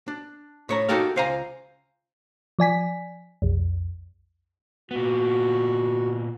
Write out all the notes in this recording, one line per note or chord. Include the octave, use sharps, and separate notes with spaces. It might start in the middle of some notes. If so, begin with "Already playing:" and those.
D4
A2 C#5 A#5
D#4 F#4 G4 A4 A#4 F5
C#2 C5 F5 G#5 A#5
F3 D5 G#5 B6
B1 F2
A#2 B3 F#4